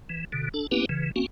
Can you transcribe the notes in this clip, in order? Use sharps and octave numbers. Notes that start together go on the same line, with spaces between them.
E3
B2 D3
D4 A4
A#3 B3 C#4 E4 G4 B4
C#3 E3
A#3 C4 C#4 F#4